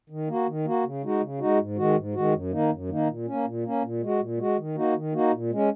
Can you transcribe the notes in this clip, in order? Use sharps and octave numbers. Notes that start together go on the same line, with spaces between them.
D#3
A#3 F#4
D#3
A#3 F#4
C#3
G#3 D#4 F#4
C#3
G#3 D#4 F#4
G#2
D#3 G#3 F#4
G#2
D#3 G#3 F#4
F#2
D#3 A#3 D#4
F#2
D#3 A#3 D#4
A#2
A#3 C#4
A#2
A#3 C#4
A#2
G#3 F#4
A#2
G#3 F#4
D#3
A#3 D#4 F#4
D#3
A#3 D#4 F#4
A#2
G#3 C#4